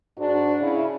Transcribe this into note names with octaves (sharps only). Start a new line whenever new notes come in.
G#2 D4 F#4
C#3 E4